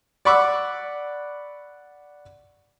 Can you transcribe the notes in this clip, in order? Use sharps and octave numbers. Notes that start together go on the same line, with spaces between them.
D5 F#5 B5 C#6 D6 E6